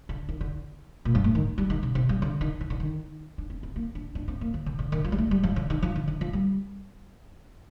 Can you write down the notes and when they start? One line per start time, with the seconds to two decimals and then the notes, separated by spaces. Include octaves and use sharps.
0.09 D3
0.29 D#3
0.41 D3
1.05 A#2
1.15 G2
1.24 A2
1.35 D#3
1.58 G3
1.70 D#3
1.83 C3
1.95 C3
2.09 G2
2.22 D3
2.41 D#3
2.61 D#3
2.70 D3
2.80 D#3
3.38 D4
3.50 C4
3.63 C4
3.76 A#3
3.95 D4
4.15 D4
4.28 C4
4.41 A#3
4.54 D#3
4.66 D3
4.79 D3
4.92 D#3
5.04 F3
5.12 G3
5.18 A3
5.31 G3
5.43 F3
5.56 D3
5.70 D#3
5.82 F3
5.95 D3
6.08 D#3
6.21 F3
6.33 G3